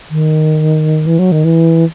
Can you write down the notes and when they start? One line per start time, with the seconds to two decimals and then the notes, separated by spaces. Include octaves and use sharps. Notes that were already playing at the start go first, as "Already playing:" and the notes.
0.10 D#3
1.06 E3
1.19 F#3
1.32 D#3
1.44 E3